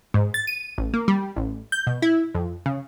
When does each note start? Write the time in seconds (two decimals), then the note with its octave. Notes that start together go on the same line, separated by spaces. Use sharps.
0.14 G#2
0.34 A6
0.47 D#7
0.78 A1
0.94 A#3
1.08 G3
1.36 A1
1.72 G6
1.87 B2
2.02 E4
2.35 F2
2.66 C#3